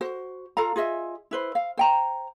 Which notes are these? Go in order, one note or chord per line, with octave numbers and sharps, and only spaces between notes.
F#4 C5
F4 A4 F5 A#5
F4 G#4 D#5 E5
E4 B4 C5
F5
C5 G5 A#5